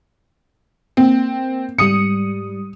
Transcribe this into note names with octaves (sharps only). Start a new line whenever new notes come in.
A#3 C4
G#2 G3 D#6 C#7